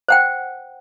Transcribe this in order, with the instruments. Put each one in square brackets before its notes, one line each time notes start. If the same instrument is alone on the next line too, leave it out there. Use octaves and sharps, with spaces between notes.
[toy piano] C5 F#5 G5